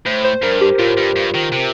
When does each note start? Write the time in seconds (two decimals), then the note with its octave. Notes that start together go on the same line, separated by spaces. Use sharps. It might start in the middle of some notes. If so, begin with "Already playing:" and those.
0.06 A2 C5
0.24 C5
0.42 G2 A#4
0.61 G4
0.79 A2 F4
0.97 G2
1.16 G2
1.34 D#3
1.52 C3